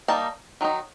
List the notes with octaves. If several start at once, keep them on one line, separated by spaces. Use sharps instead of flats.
G3 A#3 D#4 A5
D#3 F#3 D#4